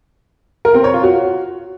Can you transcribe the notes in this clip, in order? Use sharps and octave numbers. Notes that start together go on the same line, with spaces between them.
A#4
C4
C#5
F4
F#4